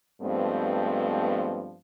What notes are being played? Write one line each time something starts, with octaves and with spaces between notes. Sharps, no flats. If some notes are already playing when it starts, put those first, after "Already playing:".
G2 F3 G#3 A3 B3 C4